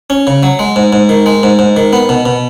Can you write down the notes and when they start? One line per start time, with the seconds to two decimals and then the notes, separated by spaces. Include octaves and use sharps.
0.10 C#4
0.27 C#3
0.43 F#3
0.59 G#3
0.76 G#2
0.93 G#2
1.09 D#3
1.26 G#3
1.43 G#2
1.59 G#2
1.77 D#3
1.93 B3
2.09 B2
2.26 B2